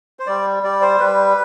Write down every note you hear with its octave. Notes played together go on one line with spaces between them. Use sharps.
C5
G3 D5
G3 D5
C5
G3 B4